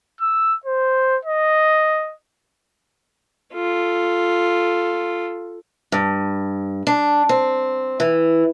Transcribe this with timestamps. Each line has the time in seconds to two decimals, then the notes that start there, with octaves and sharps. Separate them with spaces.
0.21 E6
0.66 C5
1.25 D#5
3.54 F4 A4
5.92 G2
6.87 D4
7.29 C4
8.00 E3